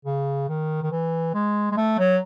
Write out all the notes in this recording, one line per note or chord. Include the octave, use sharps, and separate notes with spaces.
C#3
D#3
D#3
E3
G#3
G#3
A3
F#3